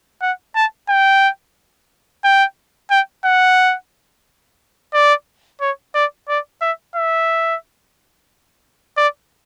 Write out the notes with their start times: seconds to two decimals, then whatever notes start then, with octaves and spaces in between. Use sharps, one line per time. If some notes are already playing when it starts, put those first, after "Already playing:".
0.22 F#5
0.56 A5
0.89 G5
2.24 G5
2.91 G5
3.25 F#5
4.94 D5
5.61 C#5
5.95 D5
6.29 D5
6.61 E5
6.95 E5
8.97 D5